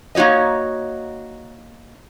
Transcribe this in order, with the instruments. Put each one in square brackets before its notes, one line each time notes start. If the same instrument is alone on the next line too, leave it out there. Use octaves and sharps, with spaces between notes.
[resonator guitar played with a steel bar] A#3 D#4 F#4 C#5 D#5